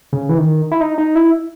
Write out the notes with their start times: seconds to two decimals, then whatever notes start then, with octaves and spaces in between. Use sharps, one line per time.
0.13 C#3
0.29 E3
0.38 D#3
0.71 E4
0.81 D#4
0.98 D#4
1.15 E4